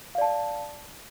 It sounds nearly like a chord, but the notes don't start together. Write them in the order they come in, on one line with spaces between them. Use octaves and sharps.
F5 D5 A5